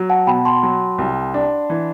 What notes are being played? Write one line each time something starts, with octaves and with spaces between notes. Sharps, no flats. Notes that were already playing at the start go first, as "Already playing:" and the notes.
Already playing: F#3
F#5 A5
B2 G5 B5
A5 C6
F#3
C2
D4
E3